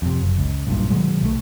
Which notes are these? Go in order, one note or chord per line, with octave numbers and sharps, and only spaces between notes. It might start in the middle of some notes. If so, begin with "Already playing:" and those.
F2 C3
F#1
C#2
B1 G2 A#2
B2 D#3 F#3 G#3
B1 A3